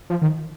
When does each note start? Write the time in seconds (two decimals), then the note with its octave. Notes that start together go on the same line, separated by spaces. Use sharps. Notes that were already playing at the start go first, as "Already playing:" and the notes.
0.10 F3
0.22 D#3